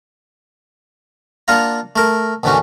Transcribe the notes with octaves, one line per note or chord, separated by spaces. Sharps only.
A#3 D4 F4 F5 F#5 A#5
A3 A#4
A#1 F2 D3 E3 C#4 F#4